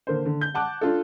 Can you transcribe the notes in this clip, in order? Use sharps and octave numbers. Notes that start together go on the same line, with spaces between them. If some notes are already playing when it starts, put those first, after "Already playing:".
D3 A#3 C5
D3
G6
F#5 A5 D6 F#6
D4 F4 A4